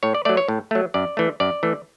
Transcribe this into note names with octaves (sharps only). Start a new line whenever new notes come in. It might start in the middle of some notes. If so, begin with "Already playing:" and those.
A2 C#5
D5
F#3 A3 D5
C#5
A2
F#3 A3
F#2 D5
E3 A3
F#2 D5
E3 A3